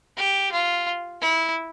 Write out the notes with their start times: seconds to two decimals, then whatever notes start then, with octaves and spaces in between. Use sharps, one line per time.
0.18 G4
0.52 F4
1.21 E4